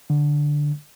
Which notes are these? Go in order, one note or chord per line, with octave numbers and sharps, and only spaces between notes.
D3